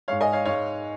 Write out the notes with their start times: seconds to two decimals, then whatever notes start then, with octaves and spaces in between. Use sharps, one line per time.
0.08 G#2 G#3 C#5 F5
0.21 D#5 G#5
0.32 C#5 F5
0.45 G#2 G#3 C#5 F5